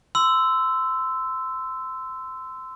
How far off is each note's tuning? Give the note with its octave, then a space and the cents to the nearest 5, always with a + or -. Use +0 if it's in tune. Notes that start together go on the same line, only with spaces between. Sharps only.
C6 -25 E6 +0